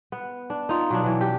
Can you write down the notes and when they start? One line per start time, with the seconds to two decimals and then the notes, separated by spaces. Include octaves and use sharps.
0.12 B3
0.50 D4
0.69 D#4 F4
0.90 B2 F#3 D4
1.04 E3 F#3
1.21 G4